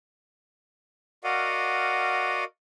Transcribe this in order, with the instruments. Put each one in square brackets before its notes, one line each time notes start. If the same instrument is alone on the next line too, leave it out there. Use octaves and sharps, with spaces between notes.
[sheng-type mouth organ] F#4 A#4 D5 D#5 F5 F#5